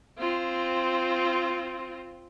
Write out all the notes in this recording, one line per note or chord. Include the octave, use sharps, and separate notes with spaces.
C4 F4